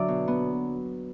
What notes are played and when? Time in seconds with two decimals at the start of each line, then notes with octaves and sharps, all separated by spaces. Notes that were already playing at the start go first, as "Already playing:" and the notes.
Already playing: D3 F#3 D5 E5
0.08 B2
0.28 B3